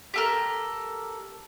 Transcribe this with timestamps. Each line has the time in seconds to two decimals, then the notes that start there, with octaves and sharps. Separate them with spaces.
0.14 G4 A4 A#4